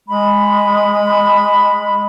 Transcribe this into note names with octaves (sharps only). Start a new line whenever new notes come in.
G#3 B5